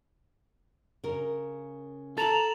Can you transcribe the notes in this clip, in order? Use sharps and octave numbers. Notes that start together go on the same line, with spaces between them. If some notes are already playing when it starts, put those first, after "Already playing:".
C#3 A#4
A4 A#5 A6 E7 F#7